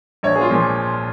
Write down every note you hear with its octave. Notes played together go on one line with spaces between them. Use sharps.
A#1 C#5
G#4
F4
A#2 F3